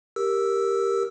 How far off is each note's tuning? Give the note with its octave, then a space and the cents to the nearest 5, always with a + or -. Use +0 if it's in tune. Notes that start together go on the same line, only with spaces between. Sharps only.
G4 +0 A#4 +0 E6 +0